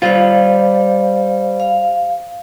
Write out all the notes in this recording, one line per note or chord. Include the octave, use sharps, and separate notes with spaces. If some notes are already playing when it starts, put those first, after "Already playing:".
G3 F4 C5 D5 F5
F5